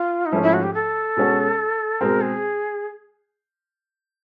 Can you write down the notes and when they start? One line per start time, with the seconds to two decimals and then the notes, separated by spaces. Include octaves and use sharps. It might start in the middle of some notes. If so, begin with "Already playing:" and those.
Already playing: F4
0.26 D#4
0.32 G#2 F3 A3 C#4 E4
0.43 E4
0.54 F#4
0.63 G4
0.74 A4
1.17 B2 G#3 C#4 F#4
2.01 B2 G#3 C4 A#4
2.21 G#4